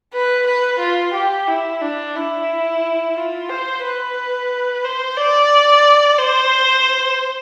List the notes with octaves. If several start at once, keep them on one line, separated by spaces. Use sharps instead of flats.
B4
B4
F4
G4
E4
D4
E4
F4
C5
B4
C5
D5
C5